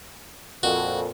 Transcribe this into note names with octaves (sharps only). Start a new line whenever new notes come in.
F2 A#2 F#4